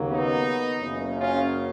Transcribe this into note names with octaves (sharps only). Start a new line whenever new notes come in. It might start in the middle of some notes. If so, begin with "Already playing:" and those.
Already playing: D#2 C#3 F#3 A#3
B3 D#4
F#1 F#2 C#3
C#4 F4